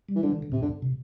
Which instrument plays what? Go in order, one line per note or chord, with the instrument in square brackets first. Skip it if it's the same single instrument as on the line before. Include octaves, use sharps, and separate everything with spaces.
[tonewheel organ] G3
[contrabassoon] E3
[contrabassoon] D3 [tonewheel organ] G3
[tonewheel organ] E3
D3
[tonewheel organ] A2 [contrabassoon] C3
[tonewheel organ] G2 [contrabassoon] D3
[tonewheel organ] C3